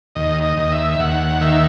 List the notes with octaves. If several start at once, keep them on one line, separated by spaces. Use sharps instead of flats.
D#2 D#5
D#5
D#2
E5
D#2 F#5
D#3 E5